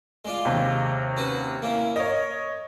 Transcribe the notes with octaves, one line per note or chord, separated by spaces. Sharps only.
G#3 D4 F4
D#2 C3
C#4 F#4 B4
A#3 C#4 E4
A#4 C#5 D#5